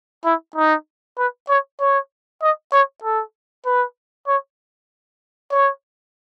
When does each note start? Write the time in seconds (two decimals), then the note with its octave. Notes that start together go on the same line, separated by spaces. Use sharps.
0.25 E4
0.56 D#4
1.18 B4
1.49 C#5
1.80 C#5
2.41 D#5
2.73 C#5
3.04 A4
3.65 B4
4.27 C#5
5.51 C#5